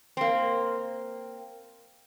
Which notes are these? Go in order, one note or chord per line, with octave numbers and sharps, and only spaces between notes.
A#3 C4